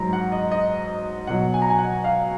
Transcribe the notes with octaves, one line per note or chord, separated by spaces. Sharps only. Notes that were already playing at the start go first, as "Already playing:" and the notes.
Already playing: G#2 F#3 A#5
F#5
D#5
D#5
B2 F#3 F#5
G#5
A#5
G#5
F#5
F5